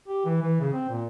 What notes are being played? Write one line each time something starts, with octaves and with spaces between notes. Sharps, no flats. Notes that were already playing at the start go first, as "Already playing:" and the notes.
G4
E3
E3
C#3
C4
A#2